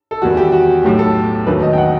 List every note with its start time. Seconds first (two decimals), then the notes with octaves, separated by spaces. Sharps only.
0.11 A4
0.22 E2 D#3 G3 F#4
0.37 G4
0.52 F#4
0.83 B1 A2 F#3 A3 G4
0.99 A4
1.46 E1 D#2 D#3 F#3 A3 B4
1.62 D#5
1.73 G5
1.78 F#5